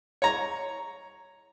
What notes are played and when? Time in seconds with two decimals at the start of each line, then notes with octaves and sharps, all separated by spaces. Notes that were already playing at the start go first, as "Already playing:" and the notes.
0.22 C#5 A#5